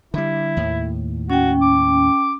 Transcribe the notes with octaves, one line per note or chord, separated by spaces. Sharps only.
D3 G3 E4
D#2 A2
C#4 F#4 G5
D6